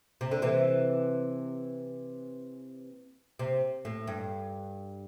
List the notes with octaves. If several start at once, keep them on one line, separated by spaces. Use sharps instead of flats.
C3
D3
C3 E3
C3
A2
G2